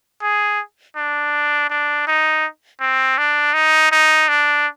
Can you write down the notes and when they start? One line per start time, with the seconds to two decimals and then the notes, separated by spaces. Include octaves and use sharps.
0.22 G#4
0.96 D4
1.70 D4
2.07 D#4
2.80 C4
3.18 D4
3.54 D#4
3.92 D#4
4.28 D4